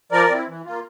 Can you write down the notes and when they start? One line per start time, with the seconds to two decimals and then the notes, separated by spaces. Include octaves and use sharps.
0.12 F3 A#4 D5
0.30 C4 E4
0.48 E3
0.66 A#3 F4